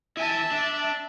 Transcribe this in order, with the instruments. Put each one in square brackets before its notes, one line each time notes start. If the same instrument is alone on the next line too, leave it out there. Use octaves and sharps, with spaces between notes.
[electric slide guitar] E4 G#5 [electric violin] E5 A5
[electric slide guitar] D4